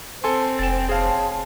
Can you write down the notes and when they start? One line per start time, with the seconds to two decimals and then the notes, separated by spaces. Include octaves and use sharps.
0.24 C4 A4 G#5 C6
0.59 F1 C5 G5 G#5 A6 E7
0.89 G#4 C#5 F5 A5 C6